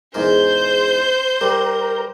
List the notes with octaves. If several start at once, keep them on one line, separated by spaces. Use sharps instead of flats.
E2 G#2 A#4 C5 G6
G3 A#4